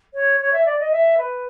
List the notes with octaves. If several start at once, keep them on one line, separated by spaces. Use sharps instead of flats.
C#5
C#5
E5
D5
D#5
E5
B4